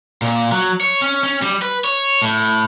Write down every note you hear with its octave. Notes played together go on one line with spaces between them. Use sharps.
A#2
F#3
C#5
C#4
C#4
G3
B4
C#5
A2